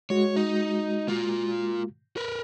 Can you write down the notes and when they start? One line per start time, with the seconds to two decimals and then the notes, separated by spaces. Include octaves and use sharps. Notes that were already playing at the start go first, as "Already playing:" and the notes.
0.10 G#3 F#4 C#5
0.36 D#4
1.08 A#3 F4
2.17 A#4 B4